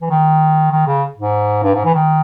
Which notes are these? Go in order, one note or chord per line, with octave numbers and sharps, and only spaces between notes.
E3
D#3
D#3
C#3
G#2
G2
G#2
E3
D#3